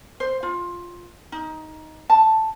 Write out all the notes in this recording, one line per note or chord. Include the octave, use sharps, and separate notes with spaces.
C5
F4
D#4
A5